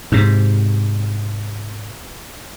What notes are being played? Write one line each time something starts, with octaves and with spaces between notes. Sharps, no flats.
G#2 C3